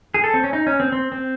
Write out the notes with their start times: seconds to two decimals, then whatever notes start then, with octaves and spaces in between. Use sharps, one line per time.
0.14 G#4
0.24 A4
0.34 C4
0.44 C#4
0.53 D#4
0.67 C#4
0.80 C4
0.92 C4
1.12 C4